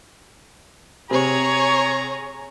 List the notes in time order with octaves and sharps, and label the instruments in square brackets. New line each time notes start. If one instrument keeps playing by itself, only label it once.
[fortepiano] C3 [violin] G#4 C#5 [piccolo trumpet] A#5